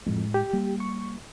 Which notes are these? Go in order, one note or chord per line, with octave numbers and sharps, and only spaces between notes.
F2 A2 G#3
G4
G3 A#3
C#6